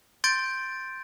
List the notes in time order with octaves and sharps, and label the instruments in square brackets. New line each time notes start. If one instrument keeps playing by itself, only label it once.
[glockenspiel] C6 G6 A6 D7